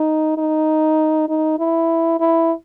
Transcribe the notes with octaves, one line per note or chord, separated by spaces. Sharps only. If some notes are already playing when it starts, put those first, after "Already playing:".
Already playing: D#4
D#4
D#4
E4
E4